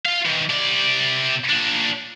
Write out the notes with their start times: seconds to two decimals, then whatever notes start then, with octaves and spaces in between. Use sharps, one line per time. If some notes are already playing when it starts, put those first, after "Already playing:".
0.05 F4 F5
0.25 D#3 E3
0.50 C3 D5
1.50 A#2 D4